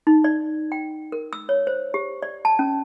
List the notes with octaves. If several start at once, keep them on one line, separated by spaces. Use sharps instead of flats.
D#4
D5
G5
A#4
E6
C#5
C5
G4
D5
A5
C#4